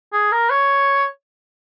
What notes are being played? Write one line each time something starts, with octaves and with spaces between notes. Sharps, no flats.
G#4
A#4
C#5